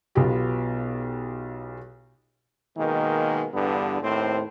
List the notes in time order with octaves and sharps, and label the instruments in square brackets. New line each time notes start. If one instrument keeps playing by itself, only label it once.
[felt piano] B1 B3 F4 G4
[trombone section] B2 D#3 G#3 A#3
E2 G2 D3 B3
D#2 A2 C4 C5